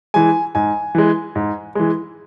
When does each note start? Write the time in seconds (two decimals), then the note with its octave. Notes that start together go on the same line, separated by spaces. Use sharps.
0.14 E3 G#3 G#5
0.55 G#2 G#5
0.95 E3 G#3
1.36 G#2
1.75 E3 G#3